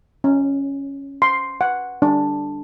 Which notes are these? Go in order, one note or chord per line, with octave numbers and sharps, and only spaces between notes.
C#4
C6
F#5
D4